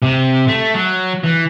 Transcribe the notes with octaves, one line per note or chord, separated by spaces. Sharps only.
C3
A3
F#3
E3